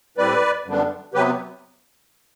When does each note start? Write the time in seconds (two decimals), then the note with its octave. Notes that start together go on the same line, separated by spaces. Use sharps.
0.17 A2 G3 C4 B4 D5
0.65 F#2 D3 G3 B3 D4
1.14 C3 F#3 B3 G4 B4